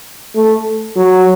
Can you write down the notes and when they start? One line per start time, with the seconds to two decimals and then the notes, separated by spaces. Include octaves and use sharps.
0.35 A3
0.96 F#3